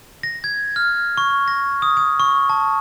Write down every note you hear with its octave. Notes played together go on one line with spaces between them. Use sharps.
A#6
G#6
F6
C#6
A#6
D#6
D#6
C#6
A5